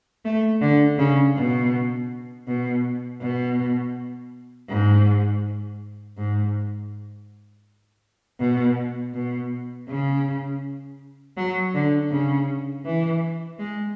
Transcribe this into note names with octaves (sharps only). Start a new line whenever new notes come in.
A3
D3
C#3
B2
B2
B2
G#2
G#2
B2
B2
C#3
F#3
D3
C#3
E3
G#3